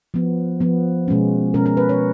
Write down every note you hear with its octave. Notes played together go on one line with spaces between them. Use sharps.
F3 B3
F3 B3
B2 G#3 C#4
B2 G#3 C#4 A#4
A#4
B4
C#5